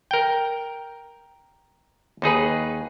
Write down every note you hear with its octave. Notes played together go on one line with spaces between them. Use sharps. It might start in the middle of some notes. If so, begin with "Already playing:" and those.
A#4 G5
D#2 D#4 G#4 B4